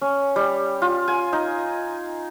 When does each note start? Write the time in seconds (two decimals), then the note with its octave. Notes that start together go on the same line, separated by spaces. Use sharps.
0.01 C#4
0.36 G3
0.82 F4
1.08 G#5
1.33 D#4